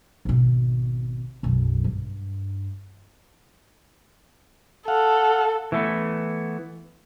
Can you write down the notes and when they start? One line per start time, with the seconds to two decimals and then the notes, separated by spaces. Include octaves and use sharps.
0.25 G#1 B2
1.43 B1 F#2
1.84 G2
4.88 A4 F5 F#5
5.72 E3 A3 B3